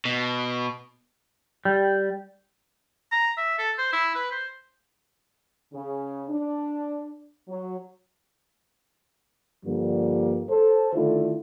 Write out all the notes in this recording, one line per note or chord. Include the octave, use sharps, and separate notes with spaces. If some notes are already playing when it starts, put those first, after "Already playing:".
B2
G3
A#5
E5
A4
C5
E4
B4
C5
C#3
D4
F#3
G2 D3 F3 G3 A#3
A4 C5
D3 D#3 A3 E4 F4